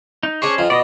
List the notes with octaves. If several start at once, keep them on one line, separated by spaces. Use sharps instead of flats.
D#4
C#4 D4 G#4 C5 C#5
F2 F3
B2 D5 D#5